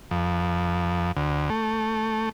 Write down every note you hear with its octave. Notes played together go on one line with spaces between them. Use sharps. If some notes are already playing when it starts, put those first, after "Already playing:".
F2
D2
A3